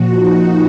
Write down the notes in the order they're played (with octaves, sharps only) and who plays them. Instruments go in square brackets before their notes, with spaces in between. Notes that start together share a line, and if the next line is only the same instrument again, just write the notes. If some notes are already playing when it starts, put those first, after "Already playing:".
Already playing: [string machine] A#2 F3 F#4
D#4